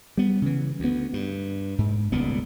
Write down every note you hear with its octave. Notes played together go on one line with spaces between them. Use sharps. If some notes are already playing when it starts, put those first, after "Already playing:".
G3 B3
C#3 E3
D2 B3
G2
G#2
D#1 C#2 A#2 B3